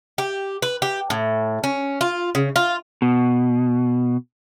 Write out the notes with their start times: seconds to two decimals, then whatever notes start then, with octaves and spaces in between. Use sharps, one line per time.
0.18 G4
0.62 B4
0.82 G4
1.10 A2
1.64 C#4
2.01 F4
2.35 C#3
2.56 F4
3.02 B2